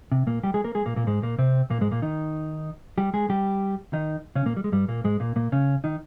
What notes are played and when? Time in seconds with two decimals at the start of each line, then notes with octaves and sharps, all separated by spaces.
0.12 C3
0.27 A#2 A#3
0.43 G3 G4
0.54 G#3 G#4
0.64 A#3 A#4
0.75 G#3 G#4
0.86 A#2 A#3
0.96 A#2 A#3
1.07 G#2 G#3
1.23 A#2 A#3
1.39 C3 C4
1.70 A#2 A#3
1.81 G#2 G#3
1.91 A#2 A#3
2.02 D#3 D#4
2.98 G3 G4
3.14 G#3 G#4
3.30 G3 G4
3.93 D#3 D#4
4.36 C#3 C#4
4.46 A#2 A#3
4.57 G3
4.64 G#3
4.72 G2 G3
4.88 A#2 A#3
5.04 G#2 G#3
5.20 A#2 A#3
5.36 A#2 A#3
5.52 C#3 C#4
5.84 D#3 D#4